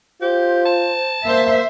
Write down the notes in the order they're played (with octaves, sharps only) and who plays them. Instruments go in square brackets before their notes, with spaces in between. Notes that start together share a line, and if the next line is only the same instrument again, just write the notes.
[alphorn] F4 [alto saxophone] G4 [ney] C5
[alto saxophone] A5
[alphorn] A#3 [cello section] C5 E5